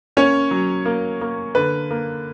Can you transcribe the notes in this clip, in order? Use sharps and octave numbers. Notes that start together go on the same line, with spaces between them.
A#3 C#4 C#5
F#3
A#3
A#3
D3 B4
A#3